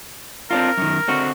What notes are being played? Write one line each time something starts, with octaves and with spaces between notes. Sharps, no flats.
C4 D4 F4 A#4
F#2 D#3
D3 C4 F#4